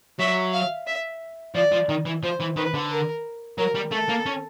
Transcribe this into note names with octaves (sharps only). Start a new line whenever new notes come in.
F#3 E5
F5
E5
F3 D5
F3
D#3
E3
F3 C5
E3
D#3 B4
D3
A#4
F#3 A#4
G3
A3 A4
A#3
C#4